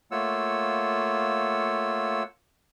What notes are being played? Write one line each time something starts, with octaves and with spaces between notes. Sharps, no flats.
A3 A#3 F4 C#5 F#5 E6